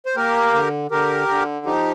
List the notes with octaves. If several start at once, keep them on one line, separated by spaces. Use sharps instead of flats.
C5
A#3 G4 A#4
D3
D3 G4 A#4
D3
F3 D#4 G4